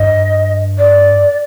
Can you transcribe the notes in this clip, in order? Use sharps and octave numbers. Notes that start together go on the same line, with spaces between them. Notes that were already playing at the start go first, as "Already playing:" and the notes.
Already playing: G2 D#5
D5